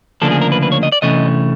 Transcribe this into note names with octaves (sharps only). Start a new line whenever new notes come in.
D2 C#3 F3 A#3 D4 A4
G#4
A#4
B4
B4
C#5
D#5
D5
C3 E3 A3 C#4 D#5